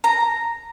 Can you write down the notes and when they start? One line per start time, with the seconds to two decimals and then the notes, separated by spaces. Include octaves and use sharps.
0.04 A#5